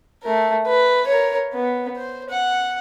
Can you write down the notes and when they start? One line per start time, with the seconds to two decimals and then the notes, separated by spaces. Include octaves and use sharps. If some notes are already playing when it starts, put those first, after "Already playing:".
0.23 A3 A#4
0.67 B4
1.07 A#4 C#5
1.53 B3
1.96 C5
2.30 F#5